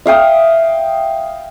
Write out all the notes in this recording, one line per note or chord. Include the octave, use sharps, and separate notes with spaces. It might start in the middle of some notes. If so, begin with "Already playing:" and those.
E5 F5 G5 D#6